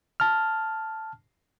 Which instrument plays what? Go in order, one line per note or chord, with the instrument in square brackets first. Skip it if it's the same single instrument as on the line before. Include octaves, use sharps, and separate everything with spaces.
[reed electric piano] A5 F6